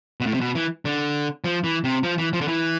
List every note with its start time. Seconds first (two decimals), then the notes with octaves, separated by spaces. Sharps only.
0.20 B2
0.26 A2
0.34 C3
0.41 B2
0.55 E3
0.85 D3
1.44 F3
1.64 E3
1.84 C3
2.03 F3
2.18 E3
2.33 F3
2.41 D3
2.48 E3